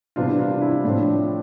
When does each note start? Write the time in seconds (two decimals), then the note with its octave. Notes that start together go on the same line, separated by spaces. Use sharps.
0.16 C3 E3 G3 B3 D4 F4
0.39 D4 F4
0.61 E4
0.84 A2 F3 A3 C4 D4